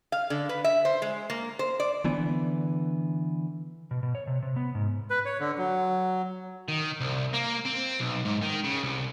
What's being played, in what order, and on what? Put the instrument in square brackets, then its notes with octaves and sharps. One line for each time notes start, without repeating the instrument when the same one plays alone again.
[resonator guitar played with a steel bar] F5
D3
B4
E5
C5
G#3
A#3
C5
D5
[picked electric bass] D3 E3 B3
[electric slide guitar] B2
B2
C#5
C3
C3
B3
G#2
[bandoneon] B4
C#5
D3
F#3
[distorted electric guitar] D#3
C2
A#3
C4
B1
G#2
D#3
C#3
C2